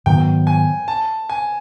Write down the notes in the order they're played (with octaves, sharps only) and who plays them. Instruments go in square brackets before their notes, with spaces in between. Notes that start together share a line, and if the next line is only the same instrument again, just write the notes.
[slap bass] G#2 D#3 F#3 B3 [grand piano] G5
[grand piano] G#5
A5
G#5